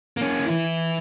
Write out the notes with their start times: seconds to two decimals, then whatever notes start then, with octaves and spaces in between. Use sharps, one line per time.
0.17 A#3 C#4
0.46 E3 E4